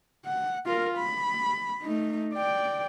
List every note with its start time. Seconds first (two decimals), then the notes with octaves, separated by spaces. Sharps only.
0.26 F#5
0.66 F4 A#4
0.98 B5
1.82 A3 D#4
2.34 D5 G5